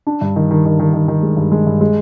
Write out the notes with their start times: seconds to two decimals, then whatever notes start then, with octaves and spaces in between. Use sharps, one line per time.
0.07 D4
0.21 G2
0.36 D#3
0.51 D#3
0.66 D#3
0.80 D#3
0.94 D#3
1.08 D#3
1.23 G#3
1.37 G2
1.52 G#3
1.67 G2
1.81 G#3